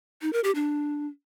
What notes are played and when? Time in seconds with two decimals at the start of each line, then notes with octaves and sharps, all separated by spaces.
0.22 D#4
0.33 A#4
0.44 G4
0.55 D4